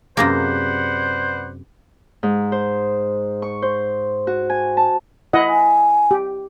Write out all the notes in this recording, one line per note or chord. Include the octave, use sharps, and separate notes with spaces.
F#2 C3 A#3 G#4 B4 C5 D5 F#5
G#2
C5
C#6
C5
F#4
G#5
A5
E4 D#5 F#5
G#5
G4